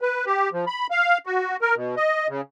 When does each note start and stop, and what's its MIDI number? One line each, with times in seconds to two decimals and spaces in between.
0.01 0.25 71
0.26 0.49 67
0.53 0.65 53
0.67 0.87 83
0.91 1.18 77
1.26 1.56 66
1.61 1.75 70
1.76 1.95 47
1.97 2.27 75
2.29 2.41 49